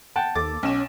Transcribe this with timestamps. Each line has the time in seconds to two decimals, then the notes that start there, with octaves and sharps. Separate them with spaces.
0.16 F#5 G5 A5
0.35 D#2 A4 D6 A6
0.63 B1 C#4 E7